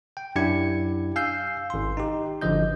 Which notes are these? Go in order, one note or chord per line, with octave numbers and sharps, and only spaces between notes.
G5
F#2 D4 E4 G4 G#6 C#7
F5 G#5 E6 G6 C7
G#1 C6
D#4 G4
G#1 D3 F3 D#5 G6